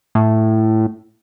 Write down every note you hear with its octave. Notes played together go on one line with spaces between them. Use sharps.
A2